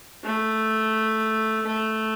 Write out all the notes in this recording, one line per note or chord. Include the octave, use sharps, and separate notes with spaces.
A3
A3